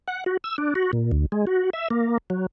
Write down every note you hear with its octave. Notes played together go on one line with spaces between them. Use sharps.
F#5
F#4
E6
D4
F#4
A#2
D2
G#3
F#4
E5
A#3
F#3